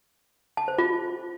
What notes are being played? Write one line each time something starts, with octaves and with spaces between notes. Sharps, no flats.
A5
C5
F4